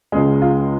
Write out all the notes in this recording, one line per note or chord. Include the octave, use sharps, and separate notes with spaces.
C#2 C#3 G#3 G#4
F4